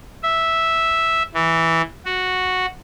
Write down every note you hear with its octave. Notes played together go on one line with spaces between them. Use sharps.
E5
E3
F#4